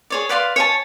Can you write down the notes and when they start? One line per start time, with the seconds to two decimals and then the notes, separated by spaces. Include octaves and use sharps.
0.10 G#4 C#5 D5
0.29 B4 D5 F5 C6
0.56 C#5 G#5 A5